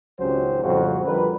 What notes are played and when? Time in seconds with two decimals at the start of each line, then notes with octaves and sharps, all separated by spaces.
0.19 G#1 C#2 F#3 C#4 G4 C5
0.63 F2 A2 C#3 G3 F#4 C5
1.05 D3 F3 G3 A#4 B4